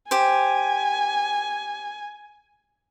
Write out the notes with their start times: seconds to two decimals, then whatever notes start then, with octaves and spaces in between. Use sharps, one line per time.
0.11 G4 C5 G#5